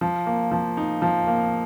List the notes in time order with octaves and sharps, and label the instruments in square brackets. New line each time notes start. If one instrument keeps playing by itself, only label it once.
[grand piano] F3
A#3
F3
D#4
F3
A#3